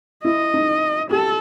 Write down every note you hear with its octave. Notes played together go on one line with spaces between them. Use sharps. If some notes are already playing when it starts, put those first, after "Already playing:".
E4 D#5
D#4
G4 A4